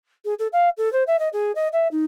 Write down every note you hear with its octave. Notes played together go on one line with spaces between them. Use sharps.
G#4
A4
F5
A4
C5
E5
D#5
G#4
D#5
E5
D#4